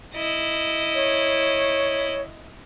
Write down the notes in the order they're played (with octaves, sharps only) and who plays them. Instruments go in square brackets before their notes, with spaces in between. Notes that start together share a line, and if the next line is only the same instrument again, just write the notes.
[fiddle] E4 D#5
[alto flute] C#5